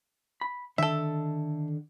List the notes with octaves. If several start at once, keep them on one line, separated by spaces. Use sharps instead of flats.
B5
D3 D#3 A4 E5